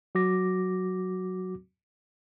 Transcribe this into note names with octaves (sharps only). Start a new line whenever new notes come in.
F#3 F#4 D6 A#6